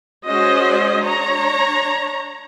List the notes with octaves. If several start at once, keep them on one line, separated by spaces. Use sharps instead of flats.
G#3 C#4 F#4 C5 D#5
D4 C#5 A#5